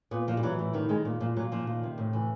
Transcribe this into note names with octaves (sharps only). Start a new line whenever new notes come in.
A#2 B3
A#2 F3
G3
E3 F#3
A2
D#3 G3
D#3 G#3
A#2
A#2 F3
A#2 F#3
A#2 F3
D#3
C3
A2
E3